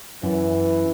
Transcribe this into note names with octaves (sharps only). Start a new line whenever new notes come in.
F#2 E3